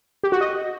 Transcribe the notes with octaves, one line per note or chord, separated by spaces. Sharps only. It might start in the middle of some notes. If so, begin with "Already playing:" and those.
G4
F#4
D#5